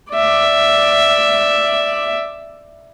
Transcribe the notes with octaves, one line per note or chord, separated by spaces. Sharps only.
D5 E5